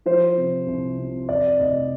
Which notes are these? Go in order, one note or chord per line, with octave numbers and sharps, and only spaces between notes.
F3 C5
C3
C2
C3
F2 D5
F1 D#5